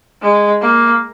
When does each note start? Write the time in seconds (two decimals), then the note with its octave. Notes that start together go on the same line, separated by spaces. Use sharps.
0.22 G#3
0.62 A#3